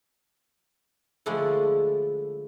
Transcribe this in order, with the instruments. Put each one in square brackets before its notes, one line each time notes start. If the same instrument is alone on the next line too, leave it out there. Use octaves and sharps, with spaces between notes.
[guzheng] D3 F3 G#3 A3 D4 E4